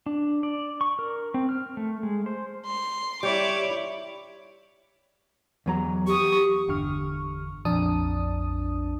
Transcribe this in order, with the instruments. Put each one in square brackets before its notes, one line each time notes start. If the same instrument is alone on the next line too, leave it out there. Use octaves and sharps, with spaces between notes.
[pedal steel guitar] D4
D5
C#6
A#4
C4
F6
A3
G#3
C5
[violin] C6
[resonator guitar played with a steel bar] G3 [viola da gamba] E4 C#5 [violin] D6
[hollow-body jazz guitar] E2 F#3 A#5
[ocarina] G4 [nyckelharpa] C#6 D#6
[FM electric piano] G1 E2 D3 C#6 F6
A#1 F2 D4 A5 D#6